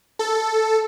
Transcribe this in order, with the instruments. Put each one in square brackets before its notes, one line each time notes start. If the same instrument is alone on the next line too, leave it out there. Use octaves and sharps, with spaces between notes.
[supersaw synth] A4